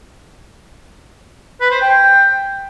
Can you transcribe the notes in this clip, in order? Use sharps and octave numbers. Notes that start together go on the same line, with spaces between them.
B4
C5
G5